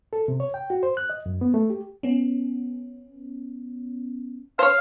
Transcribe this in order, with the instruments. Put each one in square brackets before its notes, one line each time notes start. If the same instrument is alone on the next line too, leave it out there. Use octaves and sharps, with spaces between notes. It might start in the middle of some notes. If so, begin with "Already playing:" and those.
[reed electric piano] A4
C3
C#5
G5
F#4
C5
F#6
D#5
F#2
B3
A3
G4
[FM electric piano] B3 C#4
[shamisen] C5 C#5 [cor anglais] F5